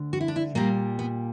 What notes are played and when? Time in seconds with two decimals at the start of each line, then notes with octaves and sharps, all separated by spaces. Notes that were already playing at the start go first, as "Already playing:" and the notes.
Already playing: D2 D3
0.13 F#4
0.21 E4
0.28 D4
0.36 E4
0.55 A#2 G3 A#3
0.99 B3